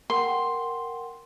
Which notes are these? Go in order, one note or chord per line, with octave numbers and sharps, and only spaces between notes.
A#4 F#5 G5 C6